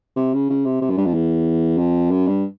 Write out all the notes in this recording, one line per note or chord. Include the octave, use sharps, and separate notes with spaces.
C3
C#3
C#3
C3
C3
F#2
G2
F2
E2
F2
F#2
G2